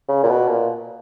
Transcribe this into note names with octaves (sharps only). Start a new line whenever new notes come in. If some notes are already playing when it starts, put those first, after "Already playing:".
C#3
A#2
B2
A#2